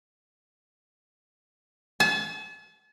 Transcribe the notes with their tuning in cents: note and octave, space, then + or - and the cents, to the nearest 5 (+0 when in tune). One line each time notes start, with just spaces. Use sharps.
A5 -40